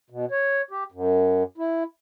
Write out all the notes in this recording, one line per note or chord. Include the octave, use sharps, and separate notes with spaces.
B2
C#5
G4
F#2
E4